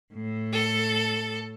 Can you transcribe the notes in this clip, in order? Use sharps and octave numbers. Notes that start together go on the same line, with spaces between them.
A2
A4